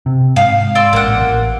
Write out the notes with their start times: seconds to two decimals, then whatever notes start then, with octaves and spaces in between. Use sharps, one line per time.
0.06 C3
0.36 G#2 F5
0.75 D5 C6 E6
0.93 A1 A#3 F#5
1.20 A1